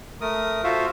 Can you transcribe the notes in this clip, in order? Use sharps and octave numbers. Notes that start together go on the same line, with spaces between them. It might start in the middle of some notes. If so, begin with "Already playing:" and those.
A3 A#4 D#6
F4 F#4 A4 C5 E5 F5